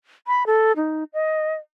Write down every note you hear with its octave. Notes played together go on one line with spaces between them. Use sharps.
B5
A4
D#4
D#5